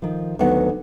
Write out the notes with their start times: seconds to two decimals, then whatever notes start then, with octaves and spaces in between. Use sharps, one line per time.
0.02 D#3 F3
0.39 D2 D#3 F#3 B3 F#5